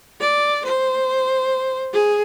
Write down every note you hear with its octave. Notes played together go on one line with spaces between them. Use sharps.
D5
C5
G#4